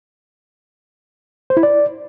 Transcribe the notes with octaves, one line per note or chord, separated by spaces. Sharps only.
C5
E4
D5